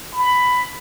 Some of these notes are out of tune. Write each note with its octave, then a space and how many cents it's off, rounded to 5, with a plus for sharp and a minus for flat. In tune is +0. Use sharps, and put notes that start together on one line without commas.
B5 +10